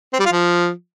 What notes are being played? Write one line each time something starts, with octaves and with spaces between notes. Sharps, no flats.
C4
G3
F4
F3